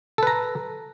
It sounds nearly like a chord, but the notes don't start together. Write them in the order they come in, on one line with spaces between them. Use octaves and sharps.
A4 B4 A#5